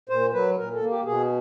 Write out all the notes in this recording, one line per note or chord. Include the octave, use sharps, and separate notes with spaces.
A#2 C5
F#3 B4
A#2 A#4
A4
A#3
G4
B2 G#4